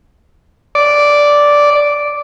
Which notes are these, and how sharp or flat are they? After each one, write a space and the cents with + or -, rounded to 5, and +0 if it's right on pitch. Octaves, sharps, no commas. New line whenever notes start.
D5 -5